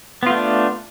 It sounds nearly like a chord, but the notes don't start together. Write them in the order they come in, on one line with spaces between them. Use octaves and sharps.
B3 F4 A3 D4